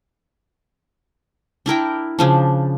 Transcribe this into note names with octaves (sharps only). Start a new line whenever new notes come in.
D4 E4 A#4 G5
C#3 F3 D4